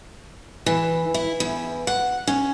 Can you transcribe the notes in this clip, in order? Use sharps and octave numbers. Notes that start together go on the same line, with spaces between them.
E3
E4
E2
F#5
C#4